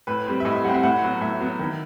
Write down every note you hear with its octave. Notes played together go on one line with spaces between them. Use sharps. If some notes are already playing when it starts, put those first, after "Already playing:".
A2 B4
G3 C4
E5
A2 D#5
E5
G3 C4 F#5
E5
A2 F#5
F#3 B3
A2 E5
F#3 B3
D#3